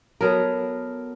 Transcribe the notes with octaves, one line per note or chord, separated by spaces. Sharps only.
F#3 B3 A4 A#4